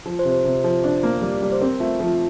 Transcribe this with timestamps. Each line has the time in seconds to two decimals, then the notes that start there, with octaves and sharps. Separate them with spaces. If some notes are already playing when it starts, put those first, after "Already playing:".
0.06 F3
0.19 C5
0.25 C3
0.32 C5
0.45 C3
0.64 F3
0.84 D4
1.03 A#3
1.22 G3 D5
1.42 G3
1.52 C5
1.61 C4 A#4
1.80 A3 F4
2.00 F3